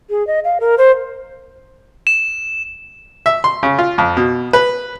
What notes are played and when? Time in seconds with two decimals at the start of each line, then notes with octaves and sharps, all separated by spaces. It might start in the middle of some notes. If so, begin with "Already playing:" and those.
0.10 G#4
0.27 D#5
0.44 F5
0.60 A#4
0.78 C5
2.07 E7
3.26 E5
3.44 C6
3.63 C#3
3.79 F4
3.98 F2
4.17 B2
4.53 B4